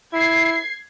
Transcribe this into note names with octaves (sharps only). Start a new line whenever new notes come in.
E4 G#6 C7